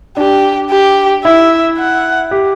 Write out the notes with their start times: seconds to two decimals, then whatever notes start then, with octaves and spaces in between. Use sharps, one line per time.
0.17 D4 G4
0.71 G4
1.24 E4 E5
1.78 F#5
2.31 G4